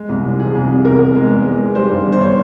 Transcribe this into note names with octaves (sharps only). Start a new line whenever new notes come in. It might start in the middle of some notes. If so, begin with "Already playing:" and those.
Already playing: G#3
C2
C3
F3 G#4
C2
C3
E2 A#4
E2
G#3
E2
G#3
G#3
G3 C5
G2
G1
C5
C#5